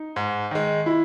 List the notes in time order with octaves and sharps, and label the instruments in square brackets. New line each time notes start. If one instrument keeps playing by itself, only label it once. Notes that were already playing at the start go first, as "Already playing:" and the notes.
Already playing: [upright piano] D#4
[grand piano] G#2
D#3 G#3
[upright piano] E4